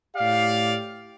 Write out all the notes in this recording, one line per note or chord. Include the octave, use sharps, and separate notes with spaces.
A2 G4 D5 F5